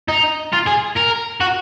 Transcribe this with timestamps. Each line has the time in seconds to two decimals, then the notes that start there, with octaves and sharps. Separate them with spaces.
0.09 D#4
0.53 F4
0.66 G#4
0.96 A#4
1.40 F#4